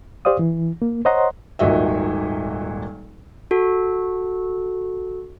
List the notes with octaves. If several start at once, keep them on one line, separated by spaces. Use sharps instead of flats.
G4 C5 D5 F5 D#6
E3
A#3
C5 C#5 D#5 F#5 A#5 C6
D#1 G#1 A#2 F#4 D#5 E5
F#4 A4